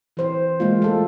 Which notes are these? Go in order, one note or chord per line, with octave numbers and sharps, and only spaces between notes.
E3 C5
G#3 A#3 F4
A3 A4